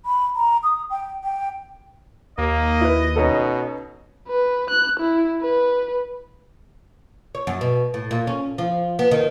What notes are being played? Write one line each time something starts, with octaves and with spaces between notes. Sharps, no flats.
B5
A#5
D#6
G5
G5
D#2 A#3 D#5
E4 B4
B2 C#4 D#4 A4
B4
F#6
E4
B4
C#5
F#2
B2
A2
A#2
C#4
F3
B3
D#3